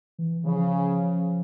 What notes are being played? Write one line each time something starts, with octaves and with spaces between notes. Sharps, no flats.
E3
C#3 F3